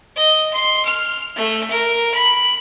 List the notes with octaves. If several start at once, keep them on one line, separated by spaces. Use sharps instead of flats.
D#5
C6
F6
A3
A#4
B5